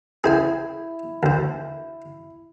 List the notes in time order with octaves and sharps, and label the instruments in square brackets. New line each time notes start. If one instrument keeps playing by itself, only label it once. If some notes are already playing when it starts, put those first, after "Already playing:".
[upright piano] E4 [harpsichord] G#4 C5 G#5
[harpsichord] D2 C5